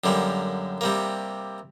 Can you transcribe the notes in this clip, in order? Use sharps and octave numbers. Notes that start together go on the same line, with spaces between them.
F#2 D3 G3 A#3
C3 G3 A#3